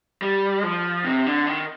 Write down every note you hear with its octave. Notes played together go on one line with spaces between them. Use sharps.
G3
F3
C3
D3
D#3